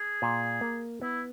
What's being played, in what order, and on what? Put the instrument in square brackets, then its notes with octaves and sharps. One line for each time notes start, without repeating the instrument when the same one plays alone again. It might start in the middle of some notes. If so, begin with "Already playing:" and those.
Already playing: [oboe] G#4
[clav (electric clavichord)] A#2
A#3
[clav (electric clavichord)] B3 [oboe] E4